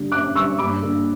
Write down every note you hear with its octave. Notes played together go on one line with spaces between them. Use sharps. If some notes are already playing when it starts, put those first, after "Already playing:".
Already playing: D3 G3
F#2 D6 F#6
D3 G3 C#6 E6
G2 B5 D6
D3 A#3